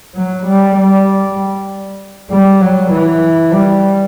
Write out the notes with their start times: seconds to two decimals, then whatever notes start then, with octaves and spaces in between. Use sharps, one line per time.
0.15 F#3
0.46 G3
0.76 G3
2.30 G3
2.60 F#3
2.91 E3
3.53 G3